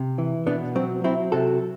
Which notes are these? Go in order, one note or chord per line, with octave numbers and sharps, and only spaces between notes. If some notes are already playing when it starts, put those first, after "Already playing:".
Already playing: C3
E3
B2 B3 D4
F#3 C4
F#3 C4 E4
C3 F#4 A4